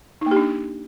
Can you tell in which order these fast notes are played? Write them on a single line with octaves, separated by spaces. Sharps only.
D#4 A#3 G4 D4